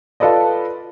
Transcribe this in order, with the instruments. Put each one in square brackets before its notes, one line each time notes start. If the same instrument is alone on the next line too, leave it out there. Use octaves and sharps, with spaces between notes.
[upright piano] F4 A4 B4 D5 D#5